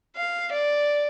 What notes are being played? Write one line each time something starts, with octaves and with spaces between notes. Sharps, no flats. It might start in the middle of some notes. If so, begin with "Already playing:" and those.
F5
D5